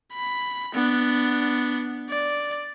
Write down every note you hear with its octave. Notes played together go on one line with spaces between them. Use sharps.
B5
B3 D4
D5